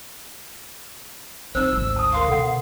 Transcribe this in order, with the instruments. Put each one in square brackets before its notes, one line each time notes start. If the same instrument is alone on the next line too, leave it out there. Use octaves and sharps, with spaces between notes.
[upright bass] C4 [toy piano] D#4 C5 [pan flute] E6
[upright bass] G#1 D2
[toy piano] A5 D#6
[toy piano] A#4 C6 C#6 [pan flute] F5
[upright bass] B2 D3 [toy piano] A4 F#5